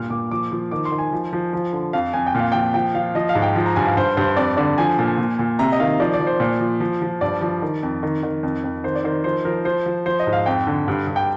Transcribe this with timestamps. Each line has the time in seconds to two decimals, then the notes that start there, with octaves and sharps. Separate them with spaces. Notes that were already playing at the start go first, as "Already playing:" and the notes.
Already playing: G2 A#2 F6
0.10 A#2 D6
0.31 F3 D6
0.52 F3
0.71 D#3 D6
0.85 C6
0.92 D#3
0.98 G#5
1.13 F3
1.33 F3
1.53 F3
1.73 D3
1.93 F2 F5
2.13 F2 G#5
2.26 G5
2.35 A#2
2.40 F5
2.52 F3 G5
2.74 F3 G5
2.94 F3 F5
3.15 F3 D#5
3.29 F5
3.35 G#2
3.42 G5
3.56 F3
3.66 A#5
3.76 G2 G#5
3.87 F5
3.97 G2 C5
4.17 G2 C5
4.37 F2 D5
4.57 D3 D5
4.78 F3 G#5
4.99 A#2
5.18 A#2
5.39 A#2
5.59 C3 A#5
5.72 D#5
5.80 D#3 F5
6.00 F3 D5
6.14 D5
6.20 F3
6.27 C5
6.40 A#2 D5
6.60 F3
6.80 F3
7.02 F3
7.21 G2 D5
7.41 F3
7.62 D#3
7.83 F2
8.03 D#3
8.23 D#3
8.43 F2
8.64 F2
8.84 D#3 C5
8.95 D5
9.04 D#3 C5
9.24 F3 C5
9.45 F3 A#4
9.65 F3 C5
9.86 F3
10.06 F3 C5
10.20 D#5
10.27 G#2
10.33 F5
10.46 F2 G5
10.67 D3
10.88 G2
11.07 G2
11.16 G5